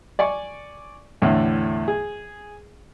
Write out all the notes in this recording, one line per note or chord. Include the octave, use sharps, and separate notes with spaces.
D5 G#5 C#6
E2 A2 D3
G#4